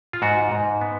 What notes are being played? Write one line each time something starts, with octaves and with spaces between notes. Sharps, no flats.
F4
G#2 F#4
G#2
B3